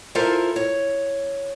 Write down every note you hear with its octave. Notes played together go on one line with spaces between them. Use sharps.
E4 F4 A4 A#4 C5 E5
C#5